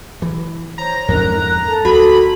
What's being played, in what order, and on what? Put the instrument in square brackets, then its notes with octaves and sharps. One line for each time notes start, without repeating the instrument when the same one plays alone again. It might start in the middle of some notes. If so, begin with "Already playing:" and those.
[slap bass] E3
[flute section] C5 C#5 [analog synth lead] A#5
[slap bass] F2 G#2 C#4 [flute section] A#4 F#6
[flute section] A4
[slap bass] D2 [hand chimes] F#4 [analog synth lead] B5